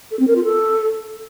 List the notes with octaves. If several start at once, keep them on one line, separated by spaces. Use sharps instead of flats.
A4
C4
A#4
F4
A4